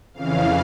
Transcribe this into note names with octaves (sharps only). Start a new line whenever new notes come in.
F2 C#3 E3 F5